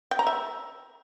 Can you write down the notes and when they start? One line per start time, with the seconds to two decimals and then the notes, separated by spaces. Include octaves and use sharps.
0.11 G5
0.19 A#5
0.27 E5